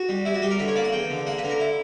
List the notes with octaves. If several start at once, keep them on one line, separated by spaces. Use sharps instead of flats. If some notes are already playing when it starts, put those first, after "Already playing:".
Already playing: F#4
G3
G3 E4
F#4
G3 G4
A#4
D3 B4
C#5
A#3 D5
F#5
E2 G5
D3
A#3 F#5
B4
D3
A#4
E4